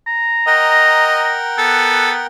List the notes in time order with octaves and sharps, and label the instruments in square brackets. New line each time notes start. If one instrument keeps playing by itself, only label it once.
[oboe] A#5
[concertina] A#4 F#5 G5 [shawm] D#5
[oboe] B3 [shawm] A4